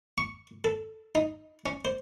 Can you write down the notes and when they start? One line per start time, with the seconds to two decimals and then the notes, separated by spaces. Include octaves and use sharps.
0.18 C#6
0.64 A4
1.15 D#4
1.66 C#4
1.85 C5